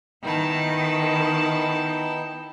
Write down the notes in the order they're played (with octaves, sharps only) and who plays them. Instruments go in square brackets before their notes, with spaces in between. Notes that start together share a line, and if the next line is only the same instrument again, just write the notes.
[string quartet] D#3 [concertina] B3 D#4 G5 [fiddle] E4 A5